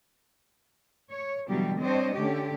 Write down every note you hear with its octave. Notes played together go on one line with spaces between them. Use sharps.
C#5
B2 D3 E3 F#3 G3 G4
G3 C4 D4 C5 C#5 D#5
D3 A3 C#4 G4